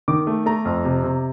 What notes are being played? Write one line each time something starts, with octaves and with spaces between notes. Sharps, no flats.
D#3 D6
A3
A3 A#5
F2
C3
C3